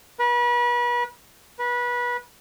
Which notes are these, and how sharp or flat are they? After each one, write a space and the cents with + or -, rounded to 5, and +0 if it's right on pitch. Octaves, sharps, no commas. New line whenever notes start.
B4 -35
B4 -25